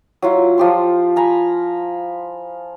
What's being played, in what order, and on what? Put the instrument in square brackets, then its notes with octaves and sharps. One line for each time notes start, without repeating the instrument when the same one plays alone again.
[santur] F#3 E4 F4
F3 G4 C6
G#5 A#5 B5